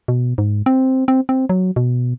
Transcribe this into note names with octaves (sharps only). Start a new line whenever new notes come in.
B2
G#2
C4
C4
C4
F#3
B2